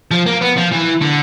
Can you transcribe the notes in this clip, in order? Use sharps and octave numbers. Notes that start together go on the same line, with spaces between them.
F3
A#3
B3
F3
E3
D3